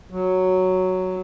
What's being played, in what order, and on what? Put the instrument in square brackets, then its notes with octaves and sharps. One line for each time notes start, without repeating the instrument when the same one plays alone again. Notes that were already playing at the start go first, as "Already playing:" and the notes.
[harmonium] F#3